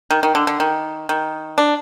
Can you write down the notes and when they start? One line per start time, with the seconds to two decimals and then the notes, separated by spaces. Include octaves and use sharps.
0.10 D#3
0.23 D#3
0.35 D3
0.47 D3
0.60 D#3
1.09 D#3
1.58 D4